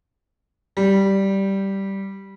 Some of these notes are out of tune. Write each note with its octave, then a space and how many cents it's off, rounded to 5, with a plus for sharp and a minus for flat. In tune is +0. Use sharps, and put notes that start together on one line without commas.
G3 -5